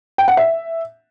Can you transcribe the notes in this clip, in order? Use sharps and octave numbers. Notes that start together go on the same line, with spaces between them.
G5
F#5
E5